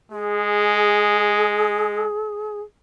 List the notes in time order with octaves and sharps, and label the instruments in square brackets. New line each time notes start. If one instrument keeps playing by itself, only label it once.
[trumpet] G#3 [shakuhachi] G#4